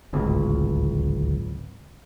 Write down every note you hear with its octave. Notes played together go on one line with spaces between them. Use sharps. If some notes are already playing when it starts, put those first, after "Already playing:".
D1 G#1 C#2